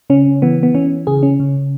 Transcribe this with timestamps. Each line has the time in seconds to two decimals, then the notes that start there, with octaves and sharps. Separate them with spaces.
0.10 C#3 C#4
0.42 E3 B3
0.63 B3
0.74 E3 C#4
1.07 C#3 G#4
1.23 C#4
1.40 C#3